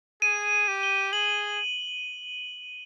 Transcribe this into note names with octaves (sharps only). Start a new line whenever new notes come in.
G#4 D#7
G4
G7
G#4 F#7